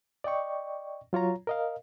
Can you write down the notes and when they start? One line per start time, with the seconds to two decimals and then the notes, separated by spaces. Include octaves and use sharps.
0.24 D5 D#5 G5 C#6
1.13 F#3 F4 C#5 A#5
1.47 A#4 D#5 F5